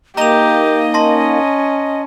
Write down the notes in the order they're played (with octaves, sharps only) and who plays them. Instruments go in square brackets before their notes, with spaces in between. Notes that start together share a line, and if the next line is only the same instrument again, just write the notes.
[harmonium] A#3 D#4 [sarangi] G4 [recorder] D#5 [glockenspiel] A#5 F7
[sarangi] C#4 [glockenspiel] A5 C6 A#6